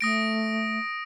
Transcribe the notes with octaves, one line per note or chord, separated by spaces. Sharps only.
A3 D#6 A#6 D7